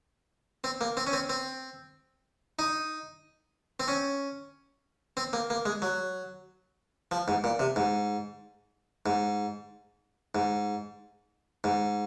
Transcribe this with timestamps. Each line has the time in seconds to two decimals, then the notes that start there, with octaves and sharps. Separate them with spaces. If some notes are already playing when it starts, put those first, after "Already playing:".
0.64 C4
0.81 A#3
0.97 C4
1.07 C#4
1.13 C4
1.29 C4
2.59 D#4
3.80 C4
3.88 C#4
5.17 C4
5.33 A#3
5.50 A#3
5.66 G#3
5.82 F#3
7.11 F3
7.28 G#2
7.44 A#2
7.60 C3
7.76 G#2
9.06 G#2
10.35 G#2
11.64 G#2